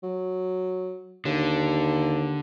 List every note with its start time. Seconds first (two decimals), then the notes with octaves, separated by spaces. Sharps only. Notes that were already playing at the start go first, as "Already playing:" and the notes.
0.03 F#3
1.25 D#2 D3